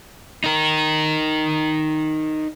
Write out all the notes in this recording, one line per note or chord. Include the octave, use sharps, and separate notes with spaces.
D#4 A#4